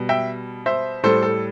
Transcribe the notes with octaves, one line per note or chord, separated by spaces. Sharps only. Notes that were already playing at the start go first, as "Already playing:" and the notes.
Already playing: B2 G3
E5 G5
C5 E5
A2 G3 A4 C5
A4